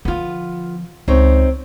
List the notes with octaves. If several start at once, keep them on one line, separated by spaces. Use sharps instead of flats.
D3 F3 B3 F4
C#2 C4 D#4 C#5